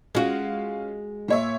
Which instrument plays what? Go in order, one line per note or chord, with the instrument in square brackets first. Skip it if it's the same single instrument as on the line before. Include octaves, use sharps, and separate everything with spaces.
[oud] G#3 F#4 [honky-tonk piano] C#4 F4 F5
[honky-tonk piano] A#2 C#5 E5